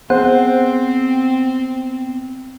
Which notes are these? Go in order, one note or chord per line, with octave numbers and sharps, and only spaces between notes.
B3 C4 G#4 C5 F#5